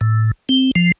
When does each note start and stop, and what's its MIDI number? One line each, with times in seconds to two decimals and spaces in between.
0.01 0.31 45
0.49 0.71 60
0.76 0.92 53